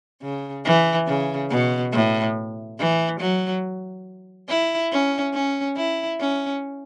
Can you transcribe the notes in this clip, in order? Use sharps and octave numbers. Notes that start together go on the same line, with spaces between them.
C#3
E3
C#3
B2
A2
E3
F#3
E4
C#4
C#4
E4
C#4